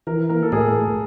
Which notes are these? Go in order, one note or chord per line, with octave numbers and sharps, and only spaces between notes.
E3 A#4
A#3 A#4
A4
A2 G#4